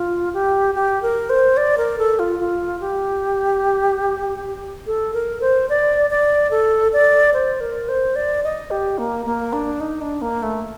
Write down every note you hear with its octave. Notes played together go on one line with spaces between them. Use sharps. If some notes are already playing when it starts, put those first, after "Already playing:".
Already playing: F4
G4
G4
A#4
C5
D5
A#4
A4
F4
F4
G4
A4
A#4
C5
D5
D5
A4
D5
C5
A#4
C5
D5
D#5
G4
A#3
A#3
D4
D#4
D4
A#3
A3